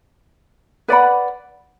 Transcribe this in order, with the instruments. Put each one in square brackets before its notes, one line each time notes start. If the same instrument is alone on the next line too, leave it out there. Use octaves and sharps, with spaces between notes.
[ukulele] B4 D5 F#5 B5